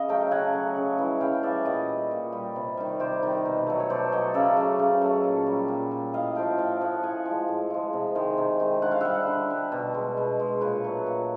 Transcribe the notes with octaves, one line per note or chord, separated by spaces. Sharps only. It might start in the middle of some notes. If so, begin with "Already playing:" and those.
Already playing: C#3 D#5
F#3 A3 F5 G5
C#3 F#5 G#5
F#3 A3
C#3
E3 G3
C#3 F5 G5
E3 G3 D5 E5
A#2 C#5 D#5
G3
A#2
G3
C3
D#3 G3
C3 C5 D5
D#3 G3
B2
F#3 A3
C#5
B2 C5 D5
F#3 A3 C#5 D#5
C#3 D5 E5
F#3 A3
C#3
F#3 A3
A#2
G3
A#2
G3
A2 D#5 F5
F3 A3 F5 G5
A2 F5 G5
F3 A3 F#5 G#5
A2 F#5 G#5
F3 G#3
A2
F3 G#3
C3
D#3 G#3
C3
D#3 G#3
D3 F#5
F5
G3 E5 F#5
D3
G3
B2
G#3
B2
G#3
A#2 B4 C#5
F#3 A3
A#2